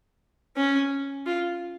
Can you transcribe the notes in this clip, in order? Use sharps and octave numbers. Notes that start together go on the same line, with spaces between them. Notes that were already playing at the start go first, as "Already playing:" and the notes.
C#4
F4